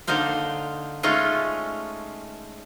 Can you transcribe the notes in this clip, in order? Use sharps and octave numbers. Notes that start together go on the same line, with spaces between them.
D3 A#3 D#4 C5 F5
G#3 A3 C#4 D#4 F4